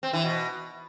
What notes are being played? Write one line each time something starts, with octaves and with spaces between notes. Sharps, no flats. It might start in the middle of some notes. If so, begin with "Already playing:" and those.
C4
E3
B2